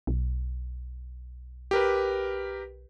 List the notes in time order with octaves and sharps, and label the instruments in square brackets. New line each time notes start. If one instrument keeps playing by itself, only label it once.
[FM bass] B1
[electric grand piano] G4 A#4 B4